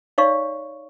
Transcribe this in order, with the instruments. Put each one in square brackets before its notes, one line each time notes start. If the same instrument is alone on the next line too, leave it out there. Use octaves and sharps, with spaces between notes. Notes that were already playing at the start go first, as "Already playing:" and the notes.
[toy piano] D#4 C#5 D5 F5 C#6